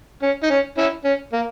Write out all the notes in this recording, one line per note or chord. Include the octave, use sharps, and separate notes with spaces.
C#4
D#4
C#4
C#4 E4
C#4
A#3